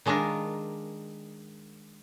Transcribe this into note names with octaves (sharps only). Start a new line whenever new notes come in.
D#3 G#3 D4 F4 A#4